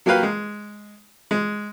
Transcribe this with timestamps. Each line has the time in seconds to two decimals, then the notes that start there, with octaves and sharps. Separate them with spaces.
0.06 F#3 A#3 G4 B4 F5
0.23 G#3
1.31 G#3